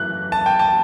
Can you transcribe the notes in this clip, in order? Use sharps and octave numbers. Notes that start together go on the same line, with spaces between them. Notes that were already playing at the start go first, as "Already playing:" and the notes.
Already playing: F#2 E3 A3 F#6
A5
G5
A5